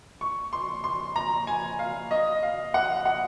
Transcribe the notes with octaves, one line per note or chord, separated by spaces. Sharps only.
C#6
C6
C6
A#5
G#5
F5
D#5
F5
F#5
F#5